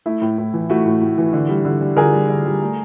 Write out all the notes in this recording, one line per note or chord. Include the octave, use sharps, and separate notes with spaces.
A3 E4
A2
A2
E3
A3 E4 F#4
A2
A2
E3
D3
G3
D3
G3
D3 G#4 A#4
G3
D3
G3
A3